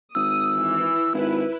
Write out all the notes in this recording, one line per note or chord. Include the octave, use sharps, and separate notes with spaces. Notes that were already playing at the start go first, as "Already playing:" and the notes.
G#1 D#6 E6
E3
G#1 E4 B4